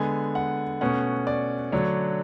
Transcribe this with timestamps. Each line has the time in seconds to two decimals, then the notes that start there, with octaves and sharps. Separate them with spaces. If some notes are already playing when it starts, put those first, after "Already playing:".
Already playing: D3 G#3 B3 G#5
0.35 F#5
0.81 B2 A3 C#4 F#5
1.27 D5
1.72 D3 F#3 A3 D4 C#5